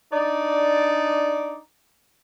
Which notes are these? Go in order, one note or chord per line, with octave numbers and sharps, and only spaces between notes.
D4 D#4 D5